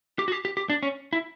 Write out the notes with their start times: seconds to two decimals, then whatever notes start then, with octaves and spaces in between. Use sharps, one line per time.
0.19 G4
0.28 F#4
0.32 G4
0.45 G4
0.57 G4
0.70 D4
0.83 C#4
1.13 E4